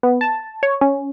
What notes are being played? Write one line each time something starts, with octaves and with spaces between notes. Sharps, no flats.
B3
A5
C#5
C#4